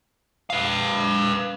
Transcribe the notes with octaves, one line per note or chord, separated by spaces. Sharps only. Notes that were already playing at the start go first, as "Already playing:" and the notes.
B4 F5